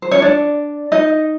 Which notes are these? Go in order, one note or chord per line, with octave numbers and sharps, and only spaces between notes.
C5
C#4 C#5
D4 D5
D#4 D#5